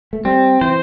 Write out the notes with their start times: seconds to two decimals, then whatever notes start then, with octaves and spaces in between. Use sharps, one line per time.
0.13 A3
0.25 G3 C4
0.61 E3 C5